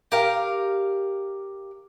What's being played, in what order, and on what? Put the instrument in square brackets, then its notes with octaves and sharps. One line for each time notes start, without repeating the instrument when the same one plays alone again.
[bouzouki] G4 A#4 F5